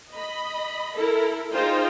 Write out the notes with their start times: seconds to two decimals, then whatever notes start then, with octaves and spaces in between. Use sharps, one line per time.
0.13 D#5 B5
0.96 E4 A4 A#4
1.53 D#4 F4 G#4 C5 G5